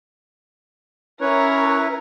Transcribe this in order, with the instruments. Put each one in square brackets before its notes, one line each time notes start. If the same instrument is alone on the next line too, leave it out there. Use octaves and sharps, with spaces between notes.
[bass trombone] C#4 [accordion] E4 B4 [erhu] A#4 [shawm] C#5